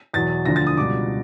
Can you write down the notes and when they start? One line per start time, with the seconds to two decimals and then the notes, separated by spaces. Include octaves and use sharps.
0.14 E2 B2 F#3 A6
0.45 D2 D3 F3 A#6
0.56 A6
0.67 D#6
0.77 C#2 B2 G3 D6